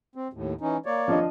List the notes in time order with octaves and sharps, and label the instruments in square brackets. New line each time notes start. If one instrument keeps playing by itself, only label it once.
[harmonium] C4
D#2 A2
E3 C#4 D#4
A#3 C#5 D5
[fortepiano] F3 D4 D#5